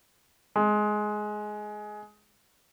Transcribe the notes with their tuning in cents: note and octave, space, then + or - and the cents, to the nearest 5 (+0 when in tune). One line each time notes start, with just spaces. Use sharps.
G#3 +15